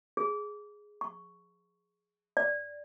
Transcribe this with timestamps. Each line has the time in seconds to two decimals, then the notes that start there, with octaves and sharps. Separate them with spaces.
0.17 G#4
1.01 C#6
2.37 D5